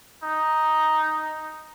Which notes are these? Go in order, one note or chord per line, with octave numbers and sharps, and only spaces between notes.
D#4